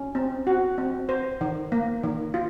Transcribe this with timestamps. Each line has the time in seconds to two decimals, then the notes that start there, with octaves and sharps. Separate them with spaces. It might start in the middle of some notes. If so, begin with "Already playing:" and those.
Already playing: C#4
0.15 C4
0.47 F#4
0.78 C4
1.09 C5
1.41 D#3
1.72 A#3
2.03 D#3
2.34 F4